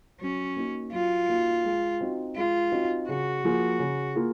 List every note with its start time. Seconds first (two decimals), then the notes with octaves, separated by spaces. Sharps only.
0.21 F#3 C#4
0.56 A#3 D#4 F#4
0.92 F#3 F4
1.29 A#3 D#4 F#4
1.64 G#3
2.01 C4 D#4 F#4
2.36 G#3 F4
2.72 C4 D#4 F#4
3.08 C#3 F#4
3.44 F3 A#3 F4 G#4
3.79 C#3
4.16 A#3 F4 G#4